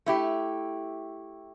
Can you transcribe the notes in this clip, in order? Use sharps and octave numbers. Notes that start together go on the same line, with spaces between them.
A3 E4 G4